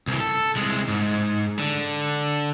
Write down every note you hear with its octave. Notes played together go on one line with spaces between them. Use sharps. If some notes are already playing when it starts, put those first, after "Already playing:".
C2 E3
A4
C2 G#3
G#2
D3